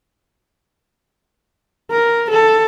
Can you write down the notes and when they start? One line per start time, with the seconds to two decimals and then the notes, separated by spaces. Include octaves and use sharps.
1.91 A#4
2.30 A4